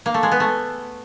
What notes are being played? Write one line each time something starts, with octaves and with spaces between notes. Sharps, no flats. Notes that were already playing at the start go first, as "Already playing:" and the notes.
A#3
A3
G#3
B3
A3